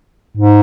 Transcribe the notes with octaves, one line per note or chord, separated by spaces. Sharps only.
G#2